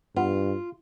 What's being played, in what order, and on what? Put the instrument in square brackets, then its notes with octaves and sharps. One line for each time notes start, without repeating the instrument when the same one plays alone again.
[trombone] G2 [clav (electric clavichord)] B3 [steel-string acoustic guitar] F4